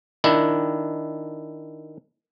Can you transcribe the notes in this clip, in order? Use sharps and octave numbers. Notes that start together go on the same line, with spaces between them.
D#3 D4 E4